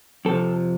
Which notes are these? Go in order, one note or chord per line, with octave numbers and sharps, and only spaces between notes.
F2 C3 F3 A4